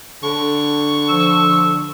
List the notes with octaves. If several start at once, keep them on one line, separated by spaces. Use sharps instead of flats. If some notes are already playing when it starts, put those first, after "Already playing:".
D3 C#6
F3 E6